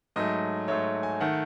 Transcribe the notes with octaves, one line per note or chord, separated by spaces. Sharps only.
G#2 F#3 A3 D#5
G#2 F#3 A3 C#5
G#5
D#3 A3 F#5